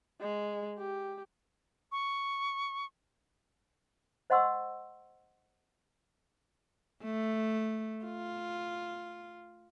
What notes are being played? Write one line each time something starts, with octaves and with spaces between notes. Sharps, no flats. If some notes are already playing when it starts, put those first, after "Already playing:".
G#3
G4
C#6
C5 D#5 F#5 C6 C#6 E6
A3
F4